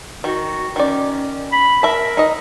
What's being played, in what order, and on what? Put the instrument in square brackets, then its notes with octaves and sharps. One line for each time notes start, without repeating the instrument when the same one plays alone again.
[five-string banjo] D#3 [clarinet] F#4
[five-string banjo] D#3 D5 [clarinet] C#4
[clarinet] B5
[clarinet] A#4 [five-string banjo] E5 A5
[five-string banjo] D#4 D#5